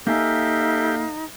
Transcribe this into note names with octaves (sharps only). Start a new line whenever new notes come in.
A#3 D#4 G4 A4 E5 F5 G#5